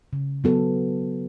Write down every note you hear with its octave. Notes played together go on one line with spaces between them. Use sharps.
C#3
F#3 B3 F#4 A4